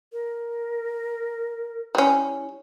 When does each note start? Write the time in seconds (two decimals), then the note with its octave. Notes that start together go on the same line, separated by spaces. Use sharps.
0.13 A#4
1.95 G3 C#4 E4